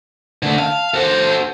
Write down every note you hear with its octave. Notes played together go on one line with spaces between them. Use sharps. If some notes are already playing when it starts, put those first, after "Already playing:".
D3 A3
F5 A5
F#4 A4 C5